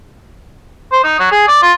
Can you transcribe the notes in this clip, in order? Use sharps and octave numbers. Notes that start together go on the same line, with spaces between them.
C5
D#4
F#3
G#4
D5
F4